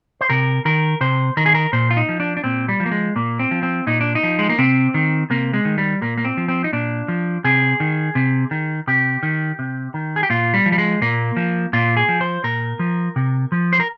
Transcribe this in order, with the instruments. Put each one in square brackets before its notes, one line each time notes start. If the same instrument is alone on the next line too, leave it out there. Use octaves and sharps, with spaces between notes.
[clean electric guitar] C5
C3 A#4
D#3 A#4
C3 C5
D#3 A#4
G#4
A#4
A#2 C5
F4
D#4
F3
D4
D4
A#2 C4
G3
F3
A#3
G#3
A#2 A#3
C4
F3
C4
A#2 D#4
D4
D#4
F3
G#3
A#3
C3 C4
D#3
C3 A#3
G#3
D#3
G3
A#2 A#3
A#3
C4
F3
C4
D#4
A#2 D4
F3
C3 G#4
D#3
C3
D#3
C3 G4
D#3
C3
D#3
G#4
G4
A#2 F4
G3
F3
G3
G#3
A#2 A#3
F3
A#2 F4
G#4
F3
C5
A#2 A#4
F3
C3
F3
C5
A#4